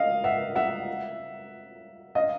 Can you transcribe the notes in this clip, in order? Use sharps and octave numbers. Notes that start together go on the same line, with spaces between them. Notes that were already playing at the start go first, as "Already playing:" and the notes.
Already playing: D#5 F5
E5 F#5
E5 F#5
D#5 F5